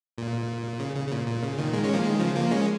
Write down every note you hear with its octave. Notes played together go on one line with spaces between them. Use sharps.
A#2
C#3
C#3
C#3
A#2
A#2
C#3
A#2 D#3
D#3 G#3
G#3 C#4
F3 A#3
D#3 G#3
C#3 F3
F3 A#3
G#3 C#4